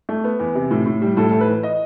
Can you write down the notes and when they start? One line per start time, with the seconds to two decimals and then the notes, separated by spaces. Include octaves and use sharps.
0.09 A3
0.24 B3
0.39 E2
0.55 C3
0.71 A2
0.86 A2
1.02 G3
1.17 A2 A4
1.29 A4
1.33 A2
1.41 B4
1.48 E3
1.63 D#5